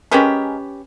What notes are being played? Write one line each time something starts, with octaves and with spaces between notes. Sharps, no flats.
G#3 C#4 G4 G#4 A#4 B4